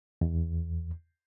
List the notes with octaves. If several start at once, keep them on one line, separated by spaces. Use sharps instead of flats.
E2